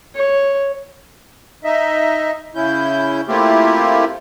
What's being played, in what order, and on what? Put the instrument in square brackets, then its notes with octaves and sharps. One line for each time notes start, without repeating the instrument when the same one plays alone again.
[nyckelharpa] C#5
[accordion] D#4 D#5 E5
C#3 C#4 E4 G6
A3 A#3 C4 E4 F4 G4